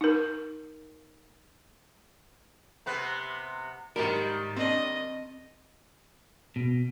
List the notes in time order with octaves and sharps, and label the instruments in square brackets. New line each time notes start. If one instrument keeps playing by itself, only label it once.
[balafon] D#4 A#4
[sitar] C3 B3 B4
[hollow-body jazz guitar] G#2 G4 A#4 [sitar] D#3 G3
[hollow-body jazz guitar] C4 D4 [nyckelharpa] D#5
[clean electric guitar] B2